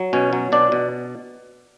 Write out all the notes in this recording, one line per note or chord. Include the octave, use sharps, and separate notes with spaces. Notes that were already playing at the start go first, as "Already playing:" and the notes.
Already playing: F#3
B2 C#4 C#5
F#3
B2 D4 D5
B2